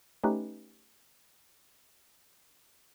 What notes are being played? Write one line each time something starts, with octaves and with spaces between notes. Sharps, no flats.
A3 C#4 D#4 G4 B4